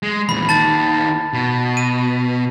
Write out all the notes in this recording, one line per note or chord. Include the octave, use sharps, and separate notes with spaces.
G#3
E2 A#2 B5
D#2 D#3 A5 A6
B2
D#7